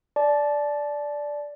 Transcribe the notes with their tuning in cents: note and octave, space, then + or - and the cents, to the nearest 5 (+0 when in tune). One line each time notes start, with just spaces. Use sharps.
D5 -5 A5 -30